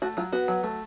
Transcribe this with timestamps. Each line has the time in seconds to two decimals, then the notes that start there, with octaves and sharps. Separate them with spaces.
0.02 A3 F#4
0.17 F#3 F4
0.32 B3 F#4
0.48 F#3
0.63 A3